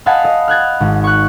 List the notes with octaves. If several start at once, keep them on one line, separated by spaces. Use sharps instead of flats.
D#5 F5 F#5 G#5 A5 B5
D#5
F6 F#6 G#6 A6
G#1
C#6 F#6